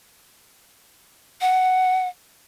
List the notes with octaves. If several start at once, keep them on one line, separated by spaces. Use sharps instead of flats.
F#5